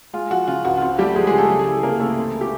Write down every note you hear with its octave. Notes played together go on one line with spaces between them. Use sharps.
G#3 F4
F3 F#4
C#3 F4
C#2 F#4
F4
C4 F#4
G3 A3 G4
F3 G#3 G#4
G#3 G#4
C#3
A3 A4
G3
G#4
E3 A4
C3 A#3 A#4
C#2 A3 A4
C4
G#3
G4